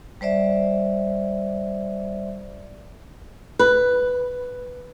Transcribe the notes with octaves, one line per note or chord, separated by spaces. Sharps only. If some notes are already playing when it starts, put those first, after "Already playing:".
G3 C5 D5 E5
B4